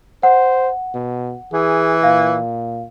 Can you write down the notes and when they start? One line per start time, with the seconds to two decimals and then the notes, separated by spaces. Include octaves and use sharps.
0.23 C5 F#5
0.94 B2
1.53 E3 G#4
2.03 A#2 F5